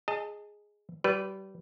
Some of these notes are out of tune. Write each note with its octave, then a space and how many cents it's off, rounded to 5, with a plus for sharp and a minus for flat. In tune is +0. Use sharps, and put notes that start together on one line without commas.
G#4 +0 D#5 +0 A5 +30
G3 -25 B4 +0